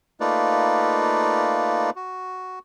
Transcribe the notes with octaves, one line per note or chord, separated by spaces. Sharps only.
A3 A#3 D#4 F4 B4 D5
F#4